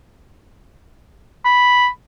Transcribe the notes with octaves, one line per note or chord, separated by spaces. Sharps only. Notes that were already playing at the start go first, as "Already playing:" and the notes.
B5